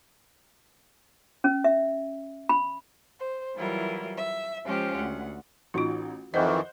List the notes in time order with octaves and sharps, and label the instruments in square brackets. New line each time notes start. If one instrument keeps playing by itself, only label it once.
[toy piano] C#4
E5
B5
[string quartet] C5
E3 F#3 G3 E4 F4 A#4
E5
F3 G#3 C#4 F4 G4 C5
D2 F#5
[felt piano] A1 D#4 [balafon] F4 F#4
[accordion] F2 D#3 E3 [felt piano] C5 F#5 G6 [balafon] D#5